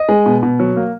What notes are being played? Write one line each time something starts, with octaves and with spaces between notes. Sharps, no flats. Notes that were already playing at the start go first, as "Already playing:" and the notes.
Already playing: D#5
G#3
B2
B2
F#3
A#3